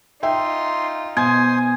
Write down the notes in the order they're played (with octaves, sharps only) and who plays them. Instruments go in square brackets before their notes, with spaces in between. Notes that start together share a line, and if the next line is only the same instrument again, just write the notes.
[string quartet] D#4 F4 [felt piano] E5 G5 [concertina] C6
[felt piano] B2 [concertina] C5 C6 D#6 [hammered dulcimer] G#5